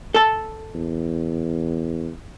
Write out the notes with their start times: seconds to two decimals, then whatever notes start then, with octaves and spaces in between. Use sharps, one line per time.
0.14 A4 A5
0.75 E2